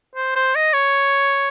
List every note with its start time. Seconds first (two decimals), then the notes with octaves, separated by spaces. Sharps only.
0.15 C5
0.36 C5
0.55 D#5
0.73 C#5